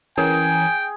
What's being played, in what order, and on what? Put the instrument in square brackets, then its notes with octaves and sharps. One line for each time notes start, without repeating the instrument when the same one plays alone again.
[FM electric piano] E3 C#4 A#4 [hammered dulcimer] G#4 [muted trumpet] G5 [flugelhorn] G#5